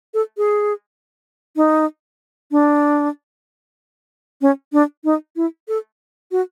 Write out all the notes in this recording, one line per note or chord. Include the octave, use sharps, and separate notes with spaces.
A4
G#4
D#4
D4
C#4
D4
D#4
E4
A4
F#4